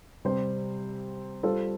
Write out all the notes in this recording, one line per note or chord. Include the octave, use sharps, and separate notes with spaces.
C3 G3 C4 G4 C5
G3 F4 A4 C5